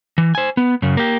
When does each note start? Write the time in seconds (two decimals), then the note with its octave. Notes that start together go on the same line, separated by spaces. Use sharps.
0.18 E3
0.35 C5 G#5
0.57 B3
0.82 F#2 C#3
0.97 A#3 G4